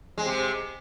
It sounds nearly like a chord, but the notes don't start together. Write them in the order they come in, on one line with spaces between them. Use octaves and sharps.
G#3 C4 C3